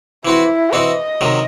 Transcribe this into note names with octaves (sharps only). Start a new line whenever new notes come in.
E3 C4 E4 F#4
E3 C4 F#4 D#5
C3 D#3 F#3